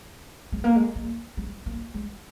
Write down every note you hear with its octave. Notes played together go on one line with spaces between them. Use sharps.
G#3
A#3
G#3
A#3
G#3
A#3
G#3